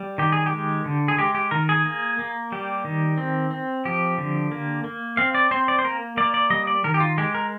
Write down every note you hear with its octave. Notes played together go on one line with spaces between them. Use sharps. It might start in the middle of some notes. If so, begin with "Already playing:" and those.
Already playing: G3
D#3 G4
G#4
G4
G#3
D3
G#4
G#3 G4
G4
D#3 A#4
G#4
A#3
A#3
G3 G4
D#3
C4
C4
F3 G4
D3
A#3
A#3
C4 F5
D5
C4 C5
D5
C5
A#3 A#4
A#3 D5
D5
G3 D#5
D5
D#3 A#4
G4
F4
G#3 G4
A#4